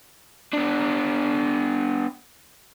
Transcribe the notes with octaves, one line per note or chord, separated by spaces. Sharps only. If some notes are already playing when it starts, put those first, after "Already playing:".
B3 D4